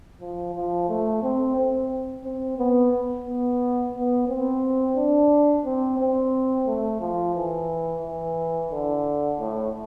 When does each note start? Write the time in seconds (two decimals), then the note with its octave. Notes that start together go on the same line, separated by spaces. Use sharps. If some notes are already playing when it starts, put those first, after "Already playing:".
0.20 F3
0.54 F3
0.89 A3
1.22 C4
1.56 C4
2.24 C4
2.58 B3
3.26 B3
3.95 B3
4.28 C4
4.97 D4
5.65 C4
5.99 C4
6.67 A3
7.00 F3
7.35 E3
8.03 E3
8.71 D3
9.39 A2